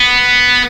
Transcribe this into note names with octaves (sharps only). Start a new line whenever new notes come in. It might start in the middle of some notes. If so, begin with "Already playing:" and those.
Already playing: B3